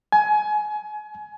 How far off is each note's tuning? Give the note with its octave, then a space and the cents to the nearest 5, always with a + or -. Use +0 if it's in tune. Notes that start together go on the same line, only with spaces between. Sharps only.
G#5 +25